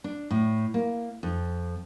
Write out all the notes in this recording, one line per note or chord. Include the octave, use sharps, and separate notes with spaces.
D4
A2
A#3
F2